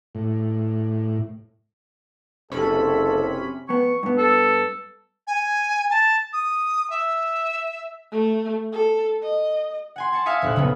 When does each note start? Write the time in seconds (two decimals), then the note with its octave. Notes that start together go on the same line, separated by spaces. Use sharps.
0.15 A2
2.52 F#1 C3 C#4 A4 B5
3.69 F2 B3 C#6
4.03 G2 B3
4.18 A4
5.27 G#5
5.91 A5
6.33 D#6
6.90 E5
8.11 A3
8.72 A4
9.22 D#5
9.96 F#5 G#5 C6
10.12 G#5 A5 C#6
10.25 E5 F5 G#5 D#6 B6 C#7
10.42 F1 A#1 F#6
10.56 C#3 F#3 A3 B3 C#4